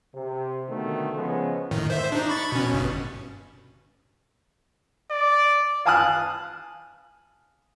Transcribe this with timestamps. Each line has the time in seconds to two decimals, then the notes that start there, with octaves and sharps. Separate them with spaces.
0.15 C3
0.69 B2 D3 D#3 A3
1.15 C#3 F3 G#3 B3
1.71 A2 D#3
1.90 C5 E5
2.12 D4 D#4
2.29 B5 C#6 A6
2.52 B2 C#4
2.72 G1 G2 B2
5.11 D5
5.85 F5 G#5 A5 D#6 F6 F#6